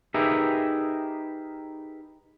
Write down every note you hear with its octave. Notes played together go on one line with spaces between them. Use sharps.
D#4 G4 G#4 A#4 B4 E5